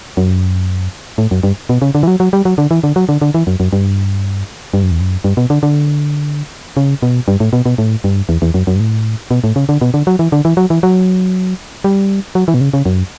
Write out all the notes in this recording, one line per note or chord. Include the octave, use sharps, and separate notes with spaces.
F#2
A2
F#2
G2
B2
C#3
D3
E3
F#3
F#3
G3
F#3
D3
E3
D3
F#3
D3
D3
E3
F#2
F#2
G2
G2
F#2
E2
F#2
G2
B2
D3
D3
C#3
B2
G2
A2
B2
B2
A2
G2
E2
E2
F#2
F#2
G2
A2
B2
A2
C#3
D3
B2
D3
F#3
E3
D3
E3
F#3
E3
F#3
G3
F#3
E3
B2
C#3
C#3
F#2